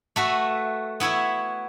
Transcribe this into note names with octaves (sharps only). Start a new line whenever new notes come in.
A3 F#4 B4 E5
B3 E4 C#5 E5